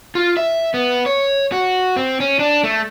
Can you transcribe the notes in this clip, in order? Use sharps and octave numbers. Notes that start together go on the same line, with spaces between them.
F4
E5
B3
C#5
F#4
C4
C#4
D4
A3